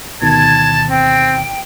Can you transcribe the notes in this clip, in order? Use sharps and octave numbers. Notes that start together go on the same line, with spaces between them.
D2 B2 D#3 A5 G#6
C4 G5